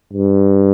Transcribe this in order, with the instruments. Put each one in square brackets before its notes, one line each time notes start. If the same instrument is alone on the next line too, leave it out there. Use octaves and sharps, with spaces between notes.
[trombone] G2